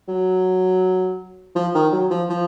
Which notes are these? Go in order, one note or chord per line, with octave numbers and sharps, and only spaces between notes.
F#3
F3
D#3
F#3
F3
F3